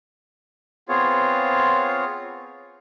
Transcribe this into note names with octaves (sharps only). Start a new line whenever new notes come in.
B3 C4 F4 G#4 C#5